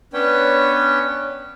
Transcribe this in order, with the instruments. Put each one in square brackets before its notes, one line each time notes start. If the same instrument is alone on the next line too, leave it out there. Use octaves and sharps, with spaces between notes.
[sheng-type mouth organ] B3 C#4 D4 B4 C#5 G5